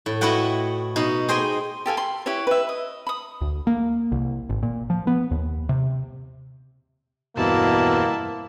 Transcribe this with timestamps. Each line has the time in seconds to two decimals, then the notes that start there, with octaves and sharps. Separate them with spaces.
0.06 A2
0.21 E4 F#4 B4 D#5 F#5 G5
0.96 B2 D#4 B4
1.28 G#4 C5 D#5 G5 G#5
1.86 G4 A4 F5 G#5
1.97 B5 C6
2.26 E4 G4 B4 C#5
2.47 B4 E5
2.69 D#5
3.07 B5 D#6
3.41 D2
3.67 A#3
4.12 C2
4.49 G#1
4.63 A#2
4.90 F3
5.07 B3
5.31 D#2
5.69 C3
7.37 E2 G2 B2 A#3 C4 E4 A5